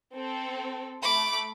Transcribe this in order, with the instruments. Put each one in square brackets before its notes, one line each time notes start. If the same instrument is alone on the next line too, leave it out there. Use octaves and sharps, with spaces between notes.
[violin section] C4 A4
[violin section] A3 [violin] B5 D6